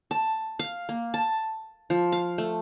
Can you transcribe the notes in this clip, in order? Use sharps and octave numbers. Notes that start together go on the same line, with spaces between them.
A5
F5
A#3
A5
F3
F5
A3